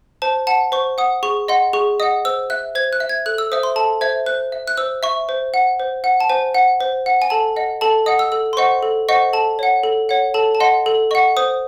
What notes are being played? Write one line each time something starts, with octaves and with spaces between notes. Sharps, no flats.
C5 A5
F#5 A5
C5 C#6
F#5 D#6
G#4 C#6
D#5 F#5 C6
G#4 C#6
D#5 F#5 D#6
C5 E6
E5 F#6
C5 G#6
F#6
E5
G#6
A4 F#6
E6
C5 E5 D#6
C6
A4 A5
C5 E5 G#6
C5 F#6
E5
F#6
C5 E6
E5 C#6
C5
F#5
C5
F#5
A5
C5 G#5
F#5
C5
F#5
G#5
A4 A5
D#5 F#5
A4 A5
D#5 F#5 D#6
E6
A4 E6
C6
C5 D#5 F#5 C#6
A4
C5 D#5 F#5 C#6
A4 A5
C#5 F#5
A4
C#5 F#5
A4 A5
A5
D#5 F#5 C6
A4
D#5 F#5 C#6
C5 D#6